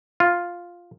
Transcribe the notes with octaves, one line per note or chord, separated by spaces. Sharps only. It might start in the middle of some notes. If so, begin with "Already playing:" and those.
F4